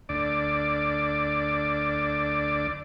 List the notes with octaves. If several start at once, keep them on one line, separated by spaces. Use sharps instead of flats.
D2 D5